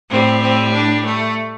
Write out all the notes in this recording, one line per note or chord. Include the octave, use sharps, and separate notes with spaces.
A2 G3 C4
C4
D4
A3